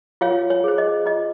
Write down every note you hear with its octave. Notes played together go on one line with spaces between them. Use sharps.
F4 C#5 F5
C#5
G#4 C5
D#5
F4 D#5